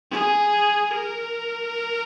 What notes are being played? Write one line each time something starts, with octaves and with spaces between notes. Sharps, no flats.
G#4
A#4